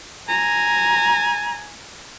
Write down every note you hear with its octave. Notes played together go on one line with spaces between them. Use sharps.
G#5 A#5